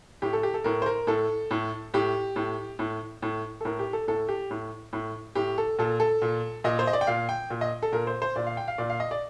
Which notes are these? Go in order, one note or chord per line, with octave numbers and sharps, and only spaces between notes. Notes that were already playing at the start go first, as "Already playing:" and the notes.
A2 G4
A4
G4
A4
A2 A#4
C5
A#4
A2 A4
A2
A2 G4
A2
A2
A2
A4
A2 A#4
G4
A4
A2 A4
G4
A2
A2
A2 G4
A4
A#2 A4
A4
A#2
A#2 D#5
C5
D#5
D5
G5
A#2 F5
G5
A#2
D#5
A4
A#2 A#4
C5
C5
A#2 D5
F5
G5
F5
A#2 D5
F5
D#5
D5